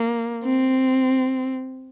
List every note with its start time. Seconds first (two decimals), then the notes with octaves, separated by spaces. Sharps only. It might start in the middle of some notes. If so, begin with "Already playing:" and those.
Already playing: A#3
0.45 C4